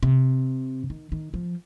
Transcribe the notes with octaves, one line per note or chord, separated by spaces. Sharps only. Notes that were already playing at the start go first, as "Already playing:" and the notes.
C3
D#3
D#3
F3